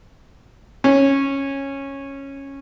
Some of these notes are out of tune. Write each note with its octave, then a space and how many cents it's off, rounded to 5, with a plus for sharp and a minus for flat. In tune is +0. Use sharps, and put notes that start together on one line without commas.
C#4 -10